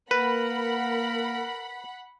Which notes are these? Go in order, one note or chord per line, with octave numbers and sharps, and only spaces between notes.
A#3 A#4 B4 F#5 B5